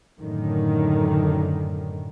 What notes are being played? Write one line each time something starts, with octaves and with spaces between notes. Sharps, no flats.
F#2 A2 D3 D#3